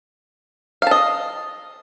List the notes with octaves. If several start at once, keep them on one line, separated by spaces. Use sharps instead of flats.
D#5 F5 A5